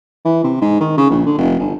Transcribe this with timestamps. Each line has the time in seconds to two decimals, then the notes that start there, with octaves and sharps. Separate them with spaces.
0.25 E3
0.44 C3
0.61 G#2
0.81 D#3
0.98 C#3
1.10 A#1
1.26 D3
1.38 F1
1.59 G1